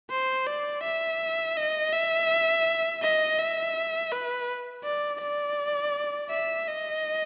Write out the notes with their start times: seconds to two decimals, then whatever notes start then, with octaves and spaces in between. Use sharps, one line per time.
0.11 C5
0.47 D5
0.84 E5
1.57 D#5
1.92 E5
3.02 D#5
3.39 E5
4.12 B4
4.84 D5
5.21 D5
6.30 E5
6.68 D#5